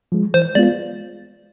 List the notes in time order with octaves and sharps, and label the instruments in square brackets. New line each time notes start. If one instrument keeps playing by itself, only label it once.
[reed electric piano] F3 G#3
[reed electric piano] E3 [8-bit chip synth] C5
[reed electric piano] G#3 B3 F4 [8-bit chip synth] D5